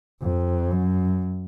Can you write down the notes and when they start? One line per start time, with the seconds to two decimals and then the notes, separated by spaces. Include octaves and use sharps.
0.22 F2
0.71 F#2